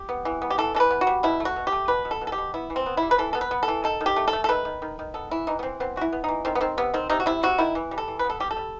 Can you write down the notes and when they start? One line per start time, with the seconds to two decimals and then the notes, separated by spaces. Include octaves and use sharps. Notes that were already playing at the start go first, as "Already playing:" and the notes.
Already playing: G4
0.09 B3
0.25 E3
0.42 B3
0.50 G4
0.58 E3 A4
0.75 E3 A4
0.80 B4
0.91 B3
1.01 F#4
1.07 G3
1.23 B2 E4
1.40 A3
1.45 F#4
1.56 B2
1.67 G4
1.72 A3
1.88 B2 B4
2.05 B2
2.11 A4
2.21 B2
2.27 A4
2.32 G4
2.38 B2
2.54 B3 E4
2.70 E3
2.76 C4
2.86 B3
2.97 G3 E4
3.11 B4
3.18 E3 A4
3.33 B3 A4
3.41 B4
3.51 B3
3.63 A4
3.68 E3
3.84 D#3 A4
4.01 D#3
4.06 G4
4.16 A3
4.28 A4
4.33 A3
4.44 A4
4.49 D#3 B4
4.65 D#3
4.82 D#3
4.99 D#3
5.14 B3 A4
5.31 E3 E4
5.47 E3 D#4
5.59 B3
5.63 E3 C4
5.80 B3 C4
5.96 E3 F#4
6.01 E4
6.13 B3
6.24 E3 D#4
6.45 D#3 C4
6.55 B3
6.61 D#3 C4
6.77 C3 B3
6.94 D#3 C4
7.10 C3 D#4
7.20 F#4
7.26 C3 E4
7.43 C3 F#4
7.58 D#3 E4
7.75 E3
7.91 G3
7.98 A4
8.08 E3
8.19 B4
8.24 B3
8.30 A4
8.40 G3 G4
8.51 A4
8.57 G3